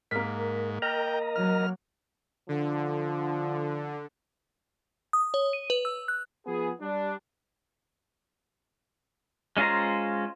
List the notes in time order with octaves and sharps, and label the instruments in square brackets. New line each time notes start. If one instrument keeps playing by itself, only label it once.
[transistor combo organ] G#2 [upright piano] A#3 B6 [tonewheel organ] A#4
[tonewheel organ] A#4 D#5 A#5 [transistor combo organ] G5
[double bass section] F#3 [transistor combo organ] F6
[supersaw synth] D3 [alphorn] F3
[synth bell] D#6
C#5
D#7
B4
E6
F#6
[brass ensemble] F3 B3 G#4
G3 D4
[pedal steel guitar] G#3 C#4 F4 C5 A#5